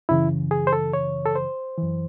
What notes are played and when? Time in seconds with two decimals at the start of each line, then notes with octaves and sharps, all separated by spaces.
0.09 F#2 C#3 E3 E4
0.51 G#4
0.67 C5
0.73 A4
0.93 C#5
1.25 A4
1.36 C5
1.78 F#2 E3